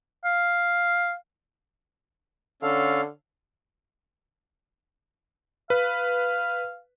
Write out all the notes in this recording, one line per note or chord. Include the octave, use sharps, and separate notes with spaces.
F5
D3 C#4 A4 F5
B4 F5